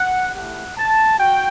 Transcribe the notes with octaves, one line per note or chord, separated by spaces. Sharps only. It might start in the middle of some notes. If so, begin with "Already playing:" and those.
Already playing: F#5
A3 E4 G4 F#5
A5
F#4 G5